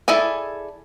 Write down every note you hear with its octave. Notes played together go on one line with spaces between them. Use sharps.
E4 G#4 A4 D5 G#5